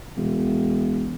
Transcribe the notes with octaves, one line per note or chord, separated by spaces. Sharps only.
E1